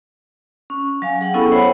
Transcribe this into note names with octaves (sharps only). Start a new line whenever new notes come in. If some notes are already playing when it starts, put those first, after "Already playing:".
C#4
F#3 F5 G#5
G#4 F#5 G5
B3 C#4 E4 A4 B5
C5 C#5 E5 F#5 G5 B5